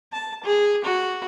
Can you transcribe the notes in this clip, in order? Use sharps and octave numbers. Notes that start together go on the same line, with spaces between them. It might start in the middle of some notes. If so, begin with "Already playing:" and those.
A5
G#4
F#4